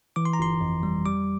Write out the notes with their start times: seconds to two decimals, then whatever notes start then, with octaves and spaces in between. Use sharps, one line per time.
0.16 E3 D6
0.25 C6
0.33 A#5
0.39 G1 C6
0.61 F2
0.83 G3
1.06 G3 D6